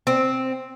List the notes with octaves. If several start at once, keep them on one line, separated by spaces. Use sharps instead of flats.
C4